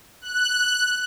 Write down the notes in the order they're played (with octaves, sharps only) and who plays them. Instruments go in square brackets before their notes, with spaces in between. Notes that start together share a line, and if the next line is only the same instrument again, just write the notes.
[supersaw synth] F#6